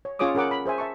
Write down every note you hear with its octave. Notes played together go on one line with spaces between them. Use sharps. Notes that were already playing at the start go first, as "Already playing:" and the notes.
C#5
C#4 F4 G#4 C#5 D6 D#6
C#4 G#4 A#4 F#5 D6
B5
G#4 C5 E5 G#5
E5 A5 C#6